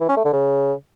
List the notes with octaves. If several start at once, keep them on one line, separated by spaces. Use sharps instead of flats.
E3
C#4
A3
D3
C#3